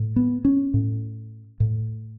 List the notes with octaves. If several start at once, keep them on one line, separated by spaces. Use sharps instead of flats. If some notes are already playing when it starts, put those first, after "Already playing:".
Already playing: A2
B3
C#4
A2
A2